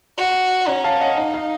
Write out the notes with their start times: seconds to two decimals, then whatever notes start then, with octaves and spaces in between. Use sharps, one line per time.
0.17 F#4
0.67 C#4 F#5 A#5
0.84 F5 A5
1.01 D#5 F#5
1.18 D#4 F5
1.34 F5